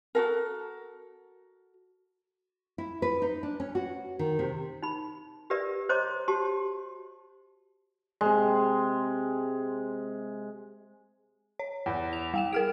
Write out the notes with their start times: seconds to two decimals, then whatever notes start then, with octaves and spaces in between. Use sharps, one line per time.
0.15 F#4 A4 A#4
2.78 E4
3.02 B4
3.22 D#4
3.43 D4
3.60 C#4
3.75 F#4
4.19 D#3
4.39 C3
4.83 D#4 B5
5.50 G4 A#4 B4 D5 E5
5.89 C5 C#5 D#5 A#5 C6 D6
6.28 F#4 G4 A5 C6
8.21 C3 G#3
11.59 C#5
11.86 E2
12.13 F7
12.34 G3 G5 E7
12.53 G#4 A#4 F6 D7